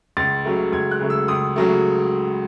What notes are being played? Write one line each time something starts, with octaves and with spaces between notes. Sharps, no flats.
C#2 A6
C#3 F#3 A3
C#2 G#6
F#6
C#3 F#3 A3
E6
C#2 D#6
C#3 F#3 A3